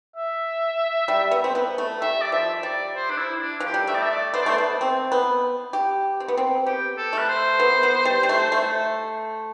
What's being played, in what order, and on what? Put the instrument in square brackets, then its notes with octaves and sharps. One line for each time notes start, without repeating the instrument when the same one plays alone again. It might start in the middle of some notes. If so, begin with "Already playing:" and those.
[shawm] E5
[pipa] G3
B3
C4
B3
A3
[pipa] G3 [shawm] E5
[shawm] D5
[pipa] F3 [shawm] E5
[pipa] G3 [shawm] D5
[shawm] C5
D4
E4
D4
[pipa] F3 [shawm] G4
[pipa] G3
[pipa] A3 [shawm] E5
[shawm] D5
E5
D5
[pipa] B3 [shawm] C5
[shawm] D5
[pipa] A3 [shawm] C5
[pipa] B3
C4
B3
G4
C4
B3
C4
[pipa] B3 [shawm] G4
[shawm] A4
[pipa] A3
[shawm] B4
C5
[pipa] B3
B3
G3
G3
A3
A3